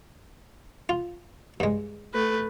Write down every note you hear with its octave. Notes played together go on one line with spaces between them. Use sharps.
F4
G2 G#3
A3 B4